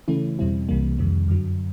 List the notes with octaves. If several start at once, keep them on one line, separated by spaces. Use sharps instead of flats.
C#3 E3 A3 C#4 E4
E2 B2 G3 C4 E4
C2 C3 E3 G3 A#3
F2 C3 D#3 G3
F#2 D3 F#3